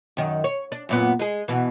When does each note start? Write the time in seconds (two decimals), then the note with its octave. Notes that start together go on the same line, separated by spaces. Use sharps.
0.17 F#2 D#3
0.44 C#5
0.72 D4
0.89 F#2 A#2 B3
1.19 G#3 G#4
1.48 B2 E3